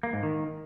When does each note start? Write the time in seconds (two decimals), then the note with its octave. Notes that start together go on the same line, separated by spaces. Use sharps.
0.03 A#3
0.13 G#2
0.23 D#3